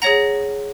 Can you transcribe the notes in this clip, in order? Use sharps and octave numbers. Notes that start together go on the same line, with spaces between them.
G#4 C#5 F#5 A#5 A#6